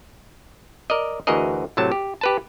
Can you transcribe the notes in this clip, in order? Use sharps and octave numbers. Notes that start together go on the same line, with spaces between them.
A#4 D5 D#5
D2 E3 F#4 G#4 A#4 D#5
A2 C3 F#3 A5
G4
G4 B4 A5